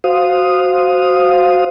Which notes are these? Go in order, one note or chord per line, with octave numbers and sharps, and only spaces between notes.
F#4 C5 F5 D#6